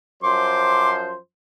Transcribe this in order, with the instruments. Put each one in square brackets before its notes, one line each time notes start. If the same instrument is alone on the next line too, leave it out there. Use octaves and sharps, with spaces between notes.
[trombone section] F#2 F3 C5 [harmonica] C6 D6